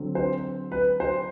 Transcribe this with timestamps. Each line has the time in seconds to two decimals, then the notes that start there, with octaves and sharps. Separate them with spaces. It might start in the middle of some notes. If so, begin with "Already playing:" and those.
Already playing: D3 F#3 C4
0.15 C5
0.72 B4
1.00 C5